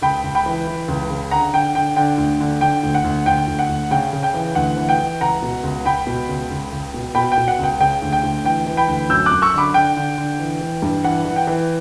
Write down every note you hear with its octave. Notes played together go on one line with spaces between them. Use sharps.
C#2 G5 B5
C#2
G5 B5
E3
E3
C#2
C#3
D3 F#5 A#5
D3 G5
D3 G5
D3 G5
D2
D3
D3 G5
D2
F#5
D2
D2 G5
D2
F#5
D2
C#3 G5
C#3
G5
E3
D2 F#5
E3
G5
E3
C#2 F#5 A#5
B2
C#2
C#2 G5 B5
B2
C#2
C#2
C#2
B2
B2 G5 B5
G5
B2
F#5
C#2 G5
C#3 G5
D2
G5
D2
E3 G5
E3
G5 B5
D2
F#2 E6 G6
D6 F#6
F#2
C#6 E6
D3 B5 D6
D3 G5
D3
D3
E3
E3
G2
E3 F#5
E3
G5
E3